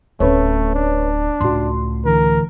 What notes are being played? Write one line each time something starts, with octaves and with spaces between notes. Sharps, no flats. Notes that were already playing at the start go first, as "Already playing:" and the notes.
D1 A3 C#4 B4 C#5
D4
C#2 A2 F#4 C6
D3 E3 A#4